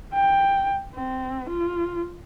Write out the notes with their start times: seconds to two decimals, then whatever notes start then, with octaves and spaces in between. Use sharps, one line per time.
0.14 G5
0.94 C4
1.49 F4